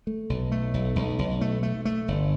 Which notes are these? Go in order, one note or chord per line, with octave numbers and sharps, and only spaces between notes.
A3
B1
A3
B1
B1
B1
A3
A3
A3
G1